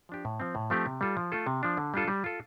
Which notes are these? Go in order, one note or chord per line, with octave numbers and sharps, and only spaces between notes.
F3 D4 G4
A2
F3 C4
A2
F3 A3 C4 G4
C3
G3 F4 A4
F3
A3 F4 A4
C3
F3 D4
D3
G3 D4 F4 A4
G3
F4 A4